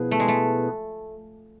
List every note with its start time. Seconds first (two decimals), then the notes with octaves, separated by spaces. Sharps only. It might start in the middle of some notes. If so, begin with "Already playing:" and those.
Already playing: B2 F3 B3 E4 G#4 B4
0.11 A3
0.20 G#3
0.28 A3